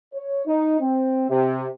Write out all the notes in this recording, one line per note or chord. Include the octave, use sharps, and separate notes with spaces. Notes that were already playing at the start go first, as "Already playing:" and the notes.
C#5
D#4
C4
C3